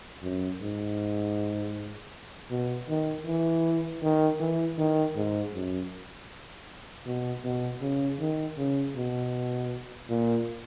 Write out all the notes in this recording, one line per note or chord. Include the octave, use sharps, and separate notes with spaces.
F#2
G#2
B2
D#3
E3
D#3
E3
D#3
G#2
F#2
B2
B2
C#3
D#3
C#3
B2
A#2